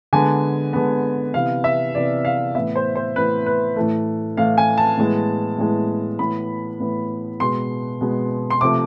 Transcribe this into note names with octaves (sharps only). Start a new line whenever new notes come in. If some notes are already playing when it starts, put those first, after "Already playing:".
D3 G#3 B3 G#5
D3 G#3 B3
C3 E3 B3 F5
E5
C3 E3 B3 D5
F5
A2 E3 B3 E5
C5
C5
A2 E3 B3 B4
B4
A2 E3 A3
A2 E3 A3 F5
G#5
A5
A2 E3 G#3 B3
A2 E3 G#3 B3
A2 E3 B3 B5
A2 E3 B3
B2 G#3 B3 C6
B2 G#3 B3
C6
C3 F3 A3 D6